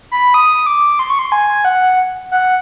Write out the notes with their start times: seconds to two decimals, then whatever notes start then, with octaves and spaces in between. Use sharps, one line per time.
0.11 B5
0.34 D#6
0.66 D6
0.99 C6
1.10 C#6
1.19 C6
1.32 G#5
1.65 F#5
2.32 F#5